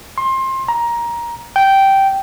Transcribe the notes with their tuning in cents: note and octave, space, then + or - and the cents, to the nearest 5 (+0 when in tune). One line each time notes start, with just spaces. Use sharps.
C6 +25
A#5 +15
G5 -10